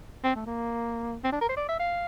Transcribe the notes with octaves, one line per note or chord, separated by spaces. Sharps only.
C4
A3
A#3
C4
D4
A#4
C5
D5
E5
F5